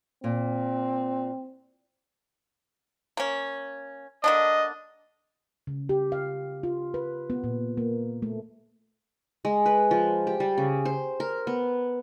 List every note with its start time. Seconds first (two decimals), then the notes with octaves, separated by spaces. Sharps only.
0.24 A#2 C4
3.17 A#3 C#4
4.24 D3 A#3 D4 D#5
5.67 C#3
5.89 G4
6.12 F5
6.63 F4
6.94 B4
7.30 B3
7.44 A#2
7.77 A#3
8.22 A3
9.45 G#3
9.66 B4
9.91 F3
10.27 G4
10.40 G3
10.58 C#3
10.85 C5
11.20 A#4
11.47 B3